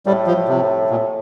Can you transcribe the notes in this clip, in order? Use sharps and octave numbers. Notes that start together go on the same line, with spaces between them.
A2 G3
F3
C3
A#2